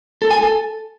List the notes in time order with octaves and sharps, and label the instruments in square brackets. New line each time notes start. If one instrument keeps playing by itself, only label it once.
[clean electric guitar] A4
G#5
A4